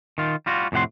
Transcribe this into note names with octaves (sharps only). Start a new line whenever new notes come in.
D#3 F4
G3 F4 F#4
F2 A2 C3 F#5 C6